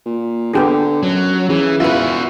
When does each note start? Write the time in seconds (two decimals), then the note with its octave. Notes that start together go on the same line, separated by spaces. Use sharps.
0.06 A#2
0.53 D3 B3 G4 G#4
1.03 F#2 F#3
1.49 C#3 E3
1.80 E2 F4 F#4 B4 E5